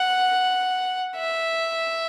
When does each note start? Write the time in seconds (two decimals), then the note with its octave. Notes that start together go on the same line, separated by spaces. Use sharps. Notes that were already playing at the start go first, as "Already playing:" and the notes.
Already playing: F#5
1.16 E5